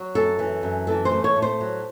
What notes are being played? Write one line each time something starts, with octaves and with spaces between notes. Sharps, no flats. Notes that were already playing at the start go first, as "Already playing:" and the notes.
Already playing: F#3
F#2 A4
E3
F#2
E3 A4
C5
A3
C#5
A2
C5
F#3